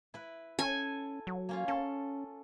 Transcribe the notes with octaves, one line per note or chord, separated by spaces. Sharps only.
E4 B4
C#4 A4 G#5
F#3
A#3 C#4 F4
C#4 A4